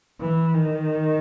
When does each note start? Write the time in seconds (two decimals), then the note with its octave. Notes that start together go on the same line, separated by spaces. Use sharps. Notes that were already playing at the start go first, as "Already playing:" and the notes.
0.20 E3
0.54 D#3